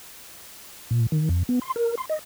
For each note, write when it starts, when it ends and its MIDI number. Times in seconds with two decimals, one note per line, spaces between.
0.91 1.06 46
1.12 1.29 51
1.29 1.43 41
1.49 1.59 59
1.61 1.73 84
1.76 1.95 70
1.98 2.05 84
2.09 2.19 75